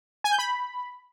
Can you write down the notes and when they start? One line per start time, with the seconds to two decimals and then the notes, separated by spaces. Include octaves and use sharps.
0.24 G#5
0.31 G6
0.39 B5